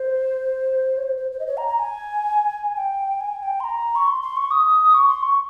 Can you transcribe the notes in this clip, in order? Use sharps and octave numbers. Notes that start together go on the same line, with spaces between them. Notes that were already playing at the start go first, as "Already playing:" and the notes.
Already playing: C5
C#5
C5
C5
C5
D#5
C#5
A#5
A#5
G#5
G5
G#5
G5
C6
A#5
C#6
C6
C6
C#6
D#6
C#6
C6
C#6